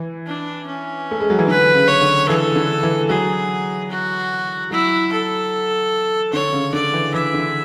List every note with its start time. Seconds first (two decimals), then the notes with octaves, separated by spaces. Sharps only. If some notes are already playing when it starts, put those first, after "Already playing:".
Already playing: E3
0.26 D4
0.66 C#4
1.11 A3
1.20 G#3
1.30 F#3
1.39 E3
1.47 D3 B4
1.75 C#3
1.87 C#5
2.02 D3
2.28 E3 A4
2.55 D3
2.83 E3
3.09 F#3 G#4
3.90 F#4
4.71 F#3 E4
5.12 A4
6.33 D3 C#5
6.53 C#3
6.73 D3 D5
6.93 E3
7.14 E3 E5
7.34 D3